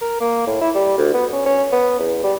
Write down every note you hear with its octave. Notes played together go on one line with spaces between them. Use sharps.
A#4
A#3
A2
E4
G3
D2
B3
C#4
C#4
B3
E2
G3